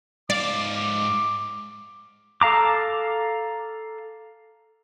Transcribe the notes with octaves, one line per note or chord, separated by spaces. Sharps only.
G#2 D5 F5 D6
A4 F5 A#5 D6